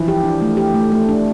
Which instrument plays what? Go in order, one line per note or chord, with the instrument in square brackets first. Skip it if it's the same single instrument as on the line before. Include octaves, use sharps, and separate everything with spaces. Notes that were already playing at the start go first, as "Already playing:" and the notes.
Already playing: [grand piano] E3 F3
[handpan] G4
D4
A3
G4
A3
A3
D4